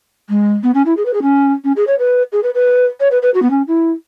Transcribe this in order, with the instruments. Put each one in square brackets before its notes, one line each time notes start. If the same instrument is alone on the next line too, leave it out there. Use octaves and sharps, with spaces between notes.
[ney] G#3
B3
C#4
E4
G#4
B4
G#4
C#4
C#4
G#4
C#5
B4
G#4
B4
B4
C#5
B4
B4
F#4
B3
C#4
E4